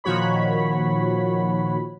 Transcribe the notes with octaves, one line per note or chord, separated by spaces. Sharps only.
A#2 D#3 F3 F#4 C#5 B5